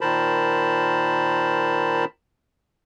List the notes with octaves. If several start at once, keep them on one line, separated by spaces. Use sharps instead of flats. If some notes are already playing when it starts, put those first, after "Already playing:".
A#2 D#3 A#4 C5 A5 B5